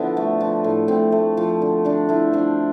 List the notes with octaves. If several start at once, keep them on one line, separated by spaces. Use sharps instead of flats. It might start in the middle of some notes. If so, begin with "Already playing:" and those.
Already playing: D3 F3 B3 E4
A3
F3
A2
A2 C4
A3
F3
D3
D3 D4
A3 E4
F3 D4